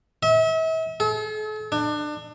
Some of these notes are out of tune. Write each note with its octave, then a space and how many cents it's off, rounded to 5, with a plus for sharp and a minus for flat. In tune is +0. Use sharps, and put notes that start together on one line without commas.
E5 -40
A4 -45
D4 +30